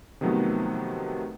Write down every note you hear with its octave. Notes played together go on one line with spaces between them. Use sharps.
C3 D#3 F3 F#3 A3 B3